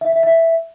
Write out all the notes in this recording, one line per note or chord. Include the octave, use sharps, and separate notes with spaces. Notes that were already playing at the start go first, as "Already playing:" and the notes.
E5
E5
E5